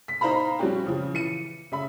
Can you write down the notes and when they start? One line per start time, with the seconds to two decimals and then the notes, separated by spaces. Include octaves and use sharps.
0.08 B6
0.21 D#4 C5 F5 A#5 B5
0.59 F3 G3 C4 C#4 F#4 G4
0.86 C#3 F3
1.14 E3 C#7 D#7
1.72 C#3 E5 B5